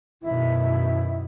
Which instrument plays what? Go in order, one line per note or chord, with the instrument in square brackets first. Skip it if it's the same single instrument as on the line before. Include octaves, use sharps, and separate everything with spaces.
[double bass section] F#2 B2 D#3 [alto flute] E4